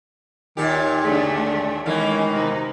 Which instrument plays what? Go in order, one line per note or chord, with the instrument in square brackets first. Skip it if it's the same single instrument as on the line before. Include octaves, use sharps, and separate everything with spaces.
[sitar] D#2 A#2 G4 [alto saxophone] D#3
[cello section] D3 A3 D4 [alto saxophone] G#4
[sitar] B2 E3 A#3 [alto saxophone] D#3 [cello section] G#3 C#4
[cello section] C3 D#4